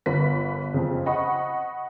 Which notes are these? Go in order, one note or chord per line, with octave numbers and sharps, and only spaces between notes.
G1 A#4 B4 B6
F2 C#3
D#5 F#5 B5 C#6